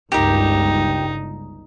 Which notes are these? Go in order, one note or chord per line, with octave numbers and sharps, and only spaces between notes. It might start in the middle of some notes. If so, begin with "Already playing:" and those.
G1 C#2 G2 D#4 G4 A#4